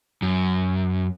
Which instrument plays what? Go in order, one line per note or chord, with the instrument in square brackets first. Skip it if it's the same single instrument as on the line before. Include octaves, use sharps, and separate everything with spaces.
[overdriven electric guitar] F#2